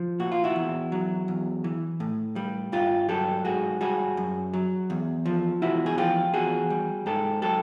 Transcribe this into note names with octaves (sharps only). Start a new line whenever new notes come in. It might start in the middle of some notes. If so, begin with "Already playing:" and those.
Already playing: F3
A#2 F#4
F4
E4 F#4
E2
F#3
E2
E3
A2
G3
G2 F4 G4
F#3 G4 A4
G#2 F#4 G#4
G3 F#4 G#4
F#2
F#3
E2
F3
E2 E4 F#4
G#4
F3 F4 G4
E2 F#4 G#4
G3
G#2 G4 A4
F#3 G4 A4